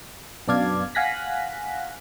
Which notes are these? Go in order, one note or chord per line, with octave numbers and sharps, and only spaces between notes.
F#2 B2 D4 D5 F5 G#6
F5 F#5 G#5 F#6 A#6 B6